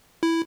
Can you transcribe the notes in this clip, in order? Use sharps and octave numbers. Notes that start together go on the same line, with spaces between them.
E4